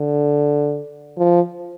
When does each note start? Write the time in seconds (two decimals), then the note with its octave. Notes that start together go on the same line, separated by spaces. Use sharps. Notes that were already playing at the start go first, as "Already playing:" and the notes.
Already playing: D3
1.18 F3